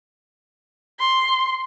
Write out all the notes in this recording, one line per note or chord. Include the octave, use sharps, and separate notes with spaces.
C6